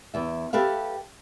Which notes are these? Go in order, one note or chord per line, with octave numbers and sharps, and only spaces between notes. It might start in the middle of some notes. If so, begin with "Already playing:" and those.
E2 E5
G4 A4 B4 E5 F5